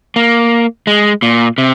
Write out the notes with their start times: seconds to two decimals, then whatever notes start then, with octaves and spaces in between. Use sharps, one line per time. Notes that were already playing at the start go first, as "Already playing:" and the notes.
0.16 A#3
0.87 G#3
1.22 A#2
1.58 C3